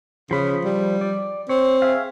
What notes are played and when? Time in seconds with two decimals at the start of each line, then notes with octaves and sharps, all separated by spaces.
0.31 C#3 F3 B5 D#6
0.65 G3
1.01 D5
1.49 C4 C#5
1.82 G#4 E5 F5